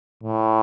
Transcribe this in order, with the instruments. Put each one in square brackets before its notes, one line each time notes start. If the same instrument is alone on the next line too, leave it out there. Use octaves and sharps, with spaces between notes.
[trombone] A2